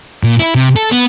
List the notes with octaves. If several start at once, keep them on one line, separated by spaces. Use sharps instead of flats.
A#2
E4
C3
A4
B3